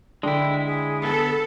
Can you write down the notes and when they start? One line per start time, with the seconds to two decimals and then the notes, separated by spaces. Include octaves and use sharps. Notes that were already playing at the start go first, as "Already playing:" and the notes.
0.23 D3 G#3 D4 E4 G5
0.64 G#4
1.04 B3 A4